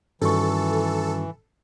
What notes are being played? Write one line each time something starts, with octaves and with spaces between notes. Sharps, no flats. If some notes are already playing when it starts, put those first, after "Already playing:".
G2 D#3 E3 G3 C#4 F#4 A4 C#6